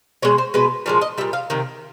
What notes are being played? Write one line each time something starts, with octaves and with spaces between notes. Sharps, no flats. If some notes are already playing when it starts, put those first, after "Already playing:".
B2 G#3 C#5
C5
B2 G#3 B4
A#2 F3 G#3 C#5
D#5
A#2 G3 E5
F5
C3 D#3